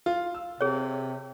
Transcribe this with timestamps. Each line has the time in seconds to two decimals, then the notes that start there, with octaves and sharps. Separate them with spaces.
0.06 F4
0.34 E6
0.61 C3 G#4 C#5